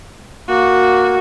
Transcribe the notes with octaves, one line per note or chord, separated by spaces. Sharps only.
A#3 F#4